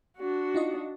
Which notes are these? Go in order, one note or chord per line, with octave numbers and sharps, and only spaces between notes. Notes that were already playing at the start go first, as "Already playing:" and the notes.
D4 F#4
D#4 F4 D#5